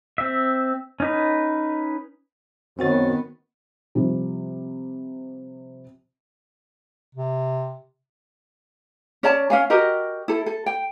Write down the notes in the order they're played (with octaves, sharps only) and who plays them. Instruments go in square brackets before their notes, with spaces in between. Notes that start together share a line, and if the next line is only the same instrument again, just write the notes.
[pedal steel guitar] C4 E5
C#4 D#4 B4
[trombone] F#2 [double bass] D#3 B3 [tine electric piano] C4 F#4 A6
[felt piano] C3 F3 G3
[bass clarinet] C3
[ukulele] C#4 C#5 D5 A5
C#4 F5 G#5
F#4 G4 A#4 D#5
E4 A4
A4
G5